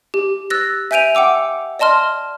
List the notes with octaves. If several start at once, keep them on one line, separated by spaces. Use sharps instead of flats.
G4
E6 F#6 A6 A#6
E5 G#5 G6 D7 D#7 F7
F#5 G5 D6 E6
D5 D#5 A5 C6 F6